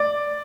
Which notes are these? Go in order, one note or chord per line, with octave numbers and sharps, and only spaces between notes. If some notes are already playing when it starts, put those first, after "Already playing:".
Already playing: D5